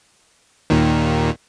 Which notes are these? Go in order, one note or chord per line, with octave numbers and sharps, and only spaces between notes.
D#2 A#2 D#3